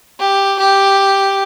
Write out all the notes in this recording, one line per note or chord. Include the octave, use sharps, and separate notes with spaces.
G4
G4